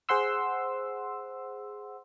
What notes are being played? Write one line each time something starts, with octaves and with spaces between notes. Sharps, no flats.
G#4 C5 F#5 C6 E6